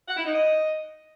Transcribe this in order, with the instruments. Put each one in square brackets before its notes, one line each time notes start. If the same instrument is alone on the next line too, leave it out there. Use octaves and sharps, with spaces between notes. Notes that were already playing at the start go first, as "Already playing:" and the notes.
[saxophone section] F#5
E4
D#4
D#5